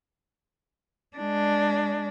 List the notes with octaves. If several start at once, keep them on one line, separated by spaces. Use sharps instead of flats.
G#3 D4